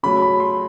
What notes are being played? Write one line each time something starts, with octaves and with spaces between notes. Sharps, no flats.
C#3 F#3 A3 B5
B5
C6